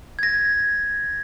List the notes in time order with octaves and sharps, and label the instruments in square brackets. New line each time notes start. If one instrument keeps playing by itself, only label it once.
[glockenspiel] G#6 A#6